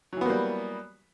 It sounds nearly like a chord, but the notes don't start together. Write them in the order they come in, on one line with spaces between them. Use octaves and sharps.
F#3 E3 B3 A#3 G3